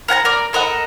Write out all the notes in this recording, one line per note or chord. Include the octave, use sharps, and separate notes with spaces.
A#4 F#5 G#5 A#5
A#4 D5
A4 A#4 D#5 F#5